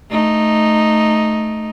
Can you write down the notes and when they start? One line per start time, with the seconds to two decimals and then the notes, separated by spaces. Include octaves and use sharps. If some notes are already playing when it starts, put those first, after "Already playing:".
0.11 A3 D#4